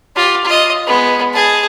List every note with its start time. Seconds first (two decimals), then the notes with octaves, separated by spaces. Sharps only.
0.16 F4 G4
0.45 F4 D#5
0.87 G#3 B3
1.34 G#4 A5